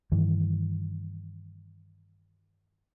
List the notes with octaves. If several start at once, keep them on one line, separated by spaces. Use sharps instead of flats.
G2 D#3 E3